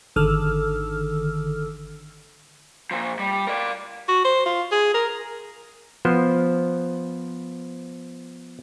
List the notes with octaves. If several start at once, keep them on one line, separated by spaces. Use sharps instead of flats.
G#1 D3 D#3 A4 E6 F6
A#2 F3
G3
A#4 D5
F#4
C5
F4
G#4
A#4
F3 B3 C5